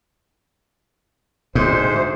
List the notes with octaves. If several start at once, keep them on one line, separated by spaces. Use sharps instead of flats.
D2 G#2 C5